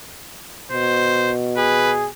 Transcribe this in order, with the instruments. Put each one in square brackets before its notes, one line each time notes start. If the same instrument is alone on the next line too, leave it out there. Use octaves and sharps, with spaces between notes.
[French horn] B2 [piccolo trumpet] C5
[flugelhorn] G#4 [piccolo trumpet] B4